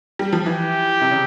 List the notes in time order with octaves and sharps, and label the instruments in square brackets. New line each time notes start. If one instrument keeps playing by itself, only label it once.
[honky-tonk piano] G3
F3
[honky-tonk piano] E3 [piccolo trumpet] G4
[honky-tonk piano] C3
C#3